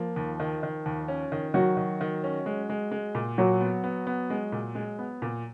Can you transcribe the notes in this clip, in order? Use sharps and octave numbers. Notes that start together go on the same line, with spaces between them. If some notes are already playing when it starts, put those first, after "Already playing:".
Already playing: F3 A#3
D#2
D#3
D#3
D#2
C#4
D#3
D#3 F#3 F#4
D#3
D#3
C#4
G#3
G#3
G#3
A#2
A#2 F#3 F#4
B3
B3
B3
G#3
A#2
G#3
B3
A#2